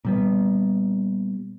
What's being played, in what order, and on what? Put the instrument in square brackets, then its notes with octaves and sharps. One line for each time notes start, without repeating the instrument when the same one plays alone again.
[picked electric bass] A#2 G3 B3